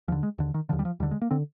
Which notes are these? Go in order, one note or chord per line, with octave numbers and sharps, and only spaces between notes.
D#2 D3 F3
G#3
D#2 D3
D#3
D#2 D3 F3
G3
F3
D#2 D3 G3
G#3
A#3
D3 C4